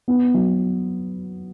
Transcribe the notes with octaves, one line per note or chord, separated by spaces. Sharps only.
B3
F#3